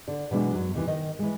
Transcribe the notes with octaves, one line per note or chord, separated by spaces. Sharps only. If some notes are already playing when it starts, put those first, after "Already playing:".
D3 D5
B2 E3 F#3 G#3 D4
F#2 F#3
D#2 C3 E3
D#3 D#5
E3 G#3